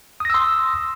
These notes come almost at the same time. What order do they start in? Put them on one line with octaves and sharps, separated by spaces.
D#6 A#6 E6 C6